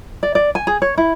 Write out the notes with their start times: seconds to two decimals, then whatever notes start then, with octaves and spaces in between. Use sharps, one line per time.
0.23 D5
0.35 D5
0.55 G#5
0.67 G#4
0.82 C#5
0.98 E4